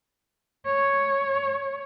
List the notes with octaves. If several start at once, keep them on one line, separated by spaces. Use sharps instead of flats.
C#5